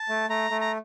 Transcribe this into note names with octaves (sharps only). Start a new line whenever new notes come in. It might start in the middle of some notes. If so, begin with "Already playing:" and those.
Already playing: A5
A3
A3 A#5
A3
A#5